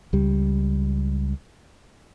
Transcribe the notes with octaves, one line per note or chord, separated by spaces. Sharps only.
C#2 G3